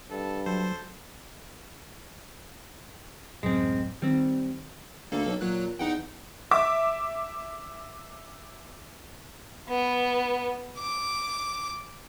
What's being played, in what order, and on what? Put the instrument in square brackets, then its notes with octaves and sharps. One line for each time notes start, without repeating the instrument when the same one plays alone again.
[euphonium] G2 [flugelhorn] A4
[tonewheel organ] F#3 [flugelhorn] A4 [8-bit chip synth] C5
[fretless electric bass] D1 A1 F#2 [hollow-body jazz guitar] G#3 C4
[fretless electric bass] D#3 [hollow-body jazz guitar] G3 C4
[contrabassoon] D2 [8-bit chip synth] A#3 A4
[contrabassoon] B1
[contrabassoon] A#2 [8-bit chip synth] F#3 F#6
[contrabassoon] E2 [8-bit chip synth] D#4 F#5 G5
[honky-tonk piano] E5 D6
[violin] B3
D6